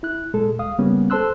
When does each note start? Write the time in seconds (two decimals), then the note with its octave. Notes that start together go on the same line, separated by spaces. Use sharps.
0.03 E4 F#6
0.34 A#2 G#3 A4
0.59 D2 G#3 F5 D#6
0.79 C#3 G3 A#3 B3 C#4
1.10 A4 C5 A5 C6 E6 F#6